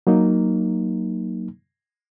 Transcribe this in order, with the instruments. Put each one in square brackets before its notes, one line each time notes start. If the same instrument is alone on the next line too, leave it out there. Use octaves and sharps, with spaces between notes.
[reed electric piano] F#3 A#3 D#4